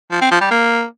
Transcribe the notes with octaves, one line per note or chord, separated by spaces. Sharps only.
F3
C4
F3
G3
A#3